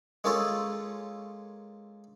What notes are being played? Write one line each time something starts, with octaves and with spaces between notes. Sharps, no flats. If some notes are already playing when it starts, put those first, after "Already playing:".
G#3 A#3 C#4 F4 A4 C#5